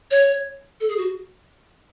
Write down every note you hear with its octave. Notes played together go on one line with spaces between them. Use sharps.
C#5
A4
G#4
F#4